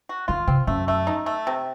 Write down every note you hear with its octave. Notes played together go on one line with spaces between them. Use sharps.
F#4
D#3 F4
C3 C4
F#2 A3
A3
D#4
A3
C3